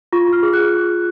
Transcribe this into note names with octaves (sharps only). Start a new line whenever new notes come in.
F4 C#6
F4 F6
G#4
F#6